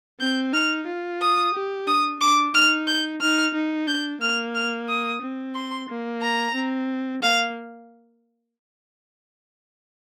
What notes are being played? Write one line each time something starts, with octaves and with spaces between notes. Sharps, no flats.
C4 G6
D#4 F6
F4
D#6
G4
D4 D#6
D4 D6
D#4 F6
G6
D#4 F6
D#4
D4 G6
A#3 F6
F6
D#6
C4
C6
A#3
A#5
C4
A#3 F5